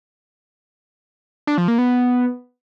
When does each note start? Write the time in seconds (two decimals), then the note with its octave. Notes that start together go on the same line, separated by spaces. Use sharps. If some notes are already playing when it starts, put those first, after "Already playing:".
1.47 D4
1.58 F3
1.68 A#3
1.78 B3